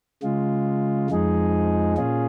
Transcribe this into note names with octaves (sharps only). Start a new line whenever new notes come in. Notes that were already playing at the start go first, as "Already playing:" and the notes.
C#3 G#3 F4
F2 F3 G#3 D#4 G#4
A#2 C#4 F4 G#4